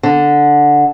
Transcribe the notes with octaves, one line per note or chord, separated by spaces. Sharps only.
D3